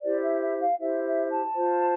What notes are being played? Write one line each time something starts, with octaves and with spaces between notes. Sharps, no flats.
E4 G4 C5 D5
E5
E5
F5
E4 G4 C5 E5
E5
A5
F4 C5